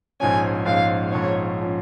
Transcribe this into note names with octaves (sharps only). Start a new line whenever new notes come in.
A#1 G#2 F3 C#4 G#5
A#1 G#2 F3 C#4 F5
A#1 G#2 F3 C#4 C#5
F3 C#4